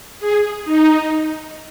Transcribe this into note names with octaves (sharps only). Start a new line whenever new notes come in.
G#4
D#4